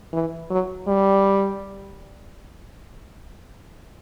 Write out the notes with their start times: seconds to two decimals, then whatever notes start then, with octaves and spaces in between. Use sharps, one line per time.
0.13 E3
0.50 F#3
0.87 G3